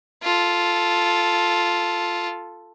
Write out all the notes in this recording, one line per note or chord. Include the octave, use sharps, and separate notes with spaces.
F4 A4